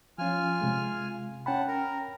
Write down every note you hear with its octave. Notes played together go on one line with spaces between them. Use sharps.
F3 C#4 F4 G#5 F6
C3 G#3
C#4 F#5 G5 A5 B5
A#4 A#5